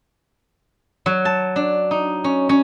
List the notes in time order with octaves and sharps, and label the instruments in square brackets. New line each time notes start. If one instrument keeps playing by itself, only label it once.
[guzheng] F#3
A5
D4
D#4
C#4
C#4